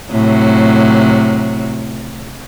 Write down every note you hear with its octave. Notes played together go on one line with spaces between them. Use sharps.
A2 C3 F#3